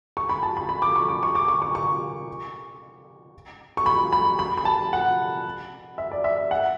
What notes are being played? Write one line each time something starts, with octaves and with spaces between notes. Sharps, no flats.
C#6
B5
A5
B5
B5
D6
C#6
D6
C#6
D6
C#6
C#6
C#6
C#6
B5
B5
B5
B5
A5
F#5
E5
D5
E5
F#5